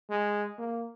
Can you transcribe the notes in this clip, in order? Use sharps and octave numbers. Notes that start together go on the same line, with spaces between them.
G#3
A#3